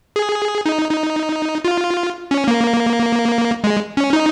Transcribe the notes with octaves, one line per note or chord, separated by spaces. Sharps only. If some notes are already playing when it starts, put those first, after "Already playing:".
G#4
D#4
D#4
F4
C#4
A#3
G#3
C#4
D#4